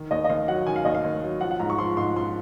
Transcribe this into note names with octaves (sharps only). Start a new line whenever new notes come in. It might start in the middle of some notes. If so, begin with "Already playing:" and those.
Already playing: D#3
D#2 D#5
D#5
D#2 F5
F#3 F#5
D#3 G#5
F5
D#2 D#5
F5
D#2
F#3
F3 F#5
F#5
G#2 A#5
C#6
F3 C6
G#2 C6
F3 C6